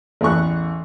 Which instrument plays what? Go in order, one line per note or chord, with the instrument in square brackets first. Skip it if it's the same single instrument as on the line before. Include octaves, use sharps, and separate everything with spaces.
[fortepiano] A1 E2 A3 C#6 F#6